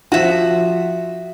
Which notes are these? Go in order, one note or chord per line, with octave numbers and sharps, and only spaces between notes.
F3 F4 F#4 E5